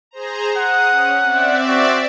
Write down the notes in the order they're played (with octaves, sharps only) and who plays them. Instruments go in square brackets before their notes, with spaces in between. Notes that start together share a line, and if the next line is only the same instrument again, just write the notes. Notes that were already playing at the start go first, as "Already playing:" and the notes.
[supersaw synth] G#4 C5 A#5
[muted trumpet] F#5 [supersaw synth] D#6
[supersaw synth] C#4
C4 D5 E5
[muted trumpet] F#4